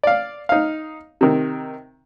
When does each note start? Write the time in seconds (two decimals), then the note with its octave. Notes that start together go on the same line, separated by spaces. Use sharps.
0.03 D5 F5
0.49 D#4 F5
1.21 C3 D#3